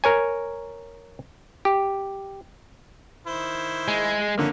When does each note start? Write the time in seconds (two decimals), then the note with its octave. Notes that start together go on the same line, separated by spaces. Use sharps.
0.04 A#4 C#5 G#5
1.65 G4
3.26 D#3 E4 C5
3.88 G#3
4.38 D3 A#3 C#4